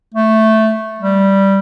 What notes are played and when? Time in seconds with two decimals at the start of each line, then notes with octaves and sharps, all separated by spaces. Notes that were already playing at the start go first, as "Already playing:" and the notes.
0.15 A3
1.00 G3